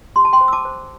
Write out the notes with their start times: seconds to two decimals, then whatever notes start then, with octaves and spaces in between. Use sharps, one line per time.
0.16 G4 C6
0.25 A5
0.33 G5 C6
0.41 C5
0.48 E6
0.53 A5 D6
0.65 C5